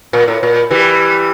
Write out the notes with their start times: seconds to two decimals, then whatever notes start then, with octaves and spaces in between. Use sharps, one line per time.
0.13 A#2
0.28 A2
0.43 A#2
0.71 E3 G3